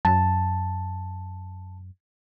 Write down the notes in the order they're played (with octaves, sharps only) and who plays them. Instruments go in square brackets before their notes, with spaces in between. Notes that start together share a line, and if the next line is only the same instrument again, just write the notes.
[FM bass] F#2 [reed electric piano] A5